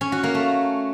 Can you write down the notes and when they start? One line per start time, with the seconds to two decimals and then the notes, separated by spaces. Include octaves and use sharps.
0.01 C#4
0.12 F#4
0.23 A#3
0.35 A3